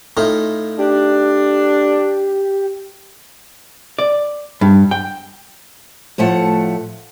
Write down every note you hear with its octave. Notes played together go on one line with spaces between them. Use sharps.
A2 D#4 F4
D4 G4
D5
G2
G5
A2 F3 A3 F#5 A5